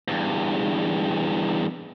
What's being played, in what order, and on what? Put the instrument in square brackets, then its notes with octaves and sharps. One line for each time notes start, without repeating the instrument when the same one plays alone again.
[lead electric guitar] E2 G2